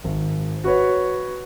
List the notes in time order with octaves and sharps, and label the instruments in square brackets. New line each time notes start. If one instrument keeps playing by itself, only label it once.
[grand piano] G#1
F#4 B4 C#5